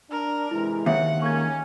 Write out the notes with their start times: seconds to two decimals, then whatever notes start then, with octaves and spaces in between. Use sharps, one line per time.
0.11 D4 A#4
0.51 C3 E3 G#3 E4
0.86 D#2 E5 F#5 C#7
1.22 G#3 A#3 C#4 C#6 G#6